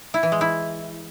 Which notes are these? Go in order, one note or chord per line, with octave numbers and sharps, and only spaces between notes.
E4
E3
G#3
E4